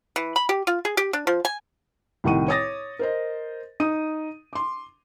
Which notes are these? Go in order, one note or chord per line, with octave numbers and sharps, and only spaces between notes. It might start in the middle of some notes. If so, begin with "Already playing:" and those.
E3
B5
G4
F4
G#4
G4
D4
F3
G#5
C2 A2 D#3 F#5 C#6 D#7
C#5 D6 D#6 A6 A#6
A#4 C5 D#5
D#4 D#6 D#7
C6 D6